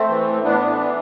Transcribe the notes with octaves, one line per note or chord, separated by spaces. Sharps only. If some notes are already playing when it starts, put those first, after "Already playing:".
Already playing: A3 C4
E3
A2
A2 B3 D4
E3
E3